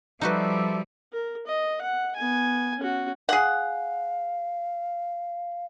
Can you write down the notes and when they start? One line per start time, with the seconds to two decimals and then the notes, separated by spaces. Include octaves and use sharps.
0.21 F3 G3 D#4 F#4 A4 B4 D5 E5
1.13 A#4
1.47 D#5
1.81 F#5
2.16 B3 G#5
2.79 C#4 F#4
3.29 G#4 F5 F#5